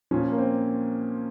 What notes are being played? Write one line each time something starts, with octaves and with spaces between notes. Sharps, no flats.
A#2 F3 C#4
A#3
C4